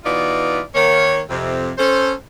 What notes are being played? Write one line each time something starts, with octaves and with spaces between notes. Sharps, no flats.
B2 E3 B3 D#4 F4 D5
D#3 A#3 C#5
F2 C3
C#4 A4 C5